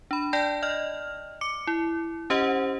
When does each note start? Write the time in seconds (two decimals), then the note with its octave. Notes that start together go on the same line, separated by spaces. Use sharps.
0.11 D4 B5
0.33 D5 G5 A5 G6 A#6
0.63 D5 D#5 F6
1.41 D6 C#7
1.67 E4
2.30 C#4 G4 C5 D#5 F#5